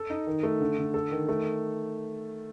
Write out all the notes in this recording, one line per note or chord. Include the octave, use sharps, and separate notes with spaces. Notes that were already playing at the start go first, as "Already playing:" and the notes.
Already playing: A4
D#4
D#3
A3
D3
D3
A4
D#3
A3